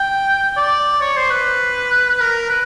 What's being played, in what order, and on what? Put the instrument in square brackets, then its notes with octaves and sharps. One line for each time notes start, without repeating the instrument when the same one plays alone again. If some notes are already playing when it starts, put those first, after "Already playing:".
Already playing: [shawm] G5
D5
C#5
C5
B4
A#4
B4